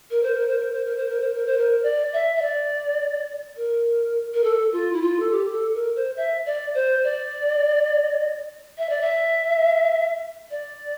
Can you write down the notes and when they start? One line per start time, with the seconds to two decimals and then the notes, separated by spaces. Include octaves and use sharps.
0.11 A#4
0.23 C5
0.34 A#4
0.48 C5
0.59 A#4
0.72 C5
0.85 A#4
0.96 C5
1.09 A#4
1.21 C5
1.34 A#4
1.46 C5
1.58 A#4
1.83 D5
2.13 E5
2.36 E5
2.42 D5
3.57 A#4
4.34 A#4
4.44 A4
4.72 F4
4.93 E4
5.02 F4
5.20 A4
5.31 G4
5.52 A4
5.74 A#4
5.96 C5
6.17 E5
6.46 D5
6.75 C5
7.04 D5
8.78 E5
8.89 D5
9.01 E5
10.51 D5